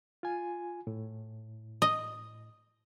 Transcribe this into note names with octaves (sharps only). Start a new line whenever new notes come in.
F4 G#5
A2
D#5